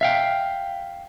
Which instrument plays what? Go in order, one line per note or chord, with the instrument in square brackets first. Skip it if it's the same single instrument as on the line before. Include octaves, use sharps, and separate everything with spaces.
[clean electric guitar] E5 F5 G5